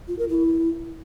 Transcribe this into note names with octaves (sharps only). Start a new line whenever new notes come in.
F4
A#4
E4